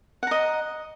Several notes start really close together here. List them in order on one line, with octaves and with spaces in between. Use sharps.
F#5 A#5 D#5